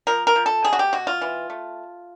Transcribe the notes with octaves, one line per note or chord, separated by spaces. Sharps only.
F3 A#4
A#4
F3
A4
B2 G#4
F#4
G4
B2 F#4
F4
E3
A3